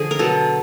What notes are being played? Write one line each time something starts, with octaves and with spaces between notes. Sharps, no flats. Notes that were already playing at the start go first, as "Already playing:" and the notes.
Already playing: D3 F3 G#4
A#4
B2 F#3 B3 A4